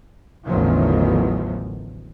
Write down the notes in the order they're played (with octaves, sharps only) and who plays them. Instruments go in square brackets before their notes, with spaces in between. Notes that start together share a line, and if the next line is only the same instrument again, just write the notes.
[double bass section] A1 E2 D3 D#3 F3 F#3